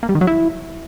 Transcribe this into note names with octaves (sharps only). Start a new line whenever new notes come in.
A#3
G3
D#3
F#3
E4